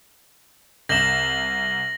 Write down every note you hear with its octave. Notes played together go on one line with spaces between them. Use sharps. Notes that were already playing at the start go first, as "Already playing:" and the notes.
C2 A#6 E7 F#7 G7